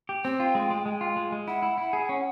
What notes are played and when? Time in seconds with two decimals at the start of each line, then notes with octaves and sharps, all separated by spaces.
0.09 G4
0.24 C4 G5
0.40 F4
0.55 G#3
0.70 G#3
0.86 G#3
1.01 F4
1.16 G#3
1.32 G#3
1.48 E4 F#5
1.62 E4
1.78 E4
1.93 G#4
2.09 C#4